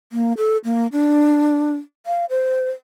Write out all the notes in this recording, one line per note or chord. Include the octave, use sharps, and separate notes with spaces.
A#3
A4
A#3
D4
F5
C5